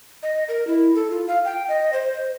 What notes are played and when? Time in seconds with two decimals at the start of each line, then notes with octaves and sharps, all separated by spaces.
0.23 D#5
0.49 A#4
0.67 E4
0.95 A4
1.10 F4
1.28 F5
1.45 G5
1.69 D#5
1.93 C5
2.13 C5